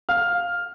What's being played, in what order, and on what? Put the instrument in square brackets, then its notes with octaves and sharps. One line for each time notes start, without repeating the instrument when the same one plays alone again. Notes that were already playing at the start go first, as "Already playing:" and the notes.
[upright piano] F5 F6